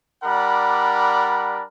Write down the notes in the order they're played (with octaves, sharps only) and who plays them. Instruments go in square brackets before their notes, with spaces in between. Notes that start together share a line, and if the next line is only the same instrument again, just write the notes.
[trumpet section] G3 D4 A#4 D5 F#5 B5